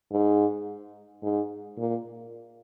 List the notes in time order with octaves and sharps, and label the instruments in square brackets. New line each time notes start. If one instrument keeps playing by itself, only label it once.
[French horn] G#2
G#2
A#2